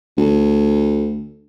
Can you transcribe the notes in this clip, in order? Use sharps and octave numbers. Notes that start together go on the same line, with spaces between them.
D2